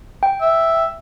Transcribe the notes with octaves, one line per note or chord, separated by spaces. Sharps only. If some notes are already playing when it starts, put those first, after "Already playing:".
G5
E5